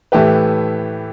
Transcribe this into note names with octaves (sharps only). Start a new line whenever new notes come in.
A2 E3 A3 G4 B4